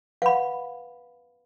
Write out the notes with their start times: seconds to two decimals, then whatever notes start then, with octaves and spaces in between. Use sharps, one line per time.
0.22 B4 F5 F#5 B5